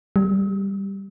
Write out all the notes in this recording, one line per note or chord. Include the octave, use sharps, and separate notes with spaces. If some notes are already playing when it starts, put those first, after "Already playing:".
G3